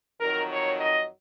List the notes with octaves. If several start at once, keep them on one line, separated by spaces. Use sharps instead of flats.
F2 D#3 F#3 A#4
C#5
D#5